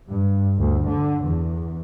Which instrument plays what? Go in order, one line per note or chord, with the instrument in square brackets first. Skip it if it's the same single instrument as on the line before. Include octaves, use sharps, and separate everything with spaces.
[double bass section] G2
D2
D3
E2